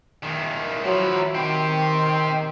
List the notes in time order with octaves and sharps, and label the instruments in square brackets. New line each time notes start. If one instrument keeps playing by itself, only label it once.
[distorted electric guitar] E2 D#3
[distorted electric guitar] F3 E4 [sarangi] F#3
[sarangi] D#3 [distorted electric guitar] C4 G4